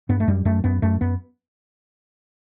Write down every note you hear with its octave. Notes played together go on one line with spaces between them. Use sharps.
G2 B3
A3
F#2 G3
F#2 A3
F#2 B3
F#2 A3
F#2 B3